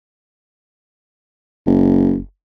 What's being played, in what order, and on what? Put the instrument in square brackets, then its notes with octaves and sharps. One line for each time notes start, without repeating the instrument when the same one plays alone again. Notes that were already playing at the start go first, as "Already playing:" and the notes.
[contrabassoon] F#1